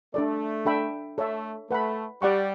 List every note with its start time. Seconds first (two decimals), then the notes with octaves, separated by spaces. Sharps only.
0.14 A3 D4 A4 D5
0.65 D4 A4 E5 G5 B5
1.18 A3 A4 C#5 E5
1.70 A3 B4 F#5 B5
2.22 G3 G4 D5 F#5 C#6